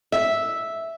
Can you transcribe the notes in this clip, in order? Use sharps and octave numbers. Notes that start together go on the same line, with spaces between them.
E5